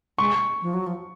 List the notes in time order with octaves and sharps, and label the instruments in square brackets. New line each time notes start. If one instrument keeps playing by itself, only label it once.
[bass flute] G#3 [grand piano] C#6
[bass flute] F3
F#3
F3